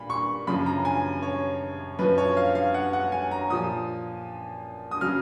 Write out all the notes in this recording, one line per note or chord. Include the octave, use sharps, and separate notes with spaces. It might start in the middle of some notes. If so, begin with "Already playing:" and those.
Already playing: A#2 B5
C#6
F#2 C#3 F3 B5
A#5
G#5
C#5
F#2 F3 B4
C#5
F5
F5
F#5
F#5
G#5
A#5
A#2 F3 D#6
D#6
C#3 F#3 F6